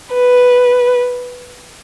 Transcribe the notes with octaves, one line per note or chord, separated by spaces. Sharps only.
B4